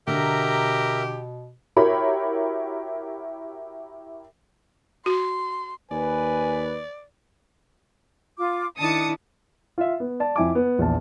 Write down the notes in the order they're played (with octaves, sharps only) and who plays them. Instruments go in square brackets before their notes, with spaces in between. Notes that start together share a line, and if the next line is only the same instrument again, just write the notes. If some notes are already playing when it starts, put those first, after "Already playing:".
[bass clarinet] B2 [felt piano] D3 [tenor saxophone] G4 [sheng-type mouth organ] A#4 E5 A#5
[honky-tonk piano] E4 F#4 G4 A#4 C#5 B5
[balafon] F#4 [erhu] C6
[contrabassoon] D#2 [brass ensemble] B4 [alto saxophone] D5 [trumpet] G#5
[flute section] F4 D6
[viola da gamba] D#3 E4 [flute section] D4 [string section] A5 D#6 C#7
[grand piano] F4 E5
B3
D5 A5
F2 E4 G#5 D6
B3
A#1 E2 A5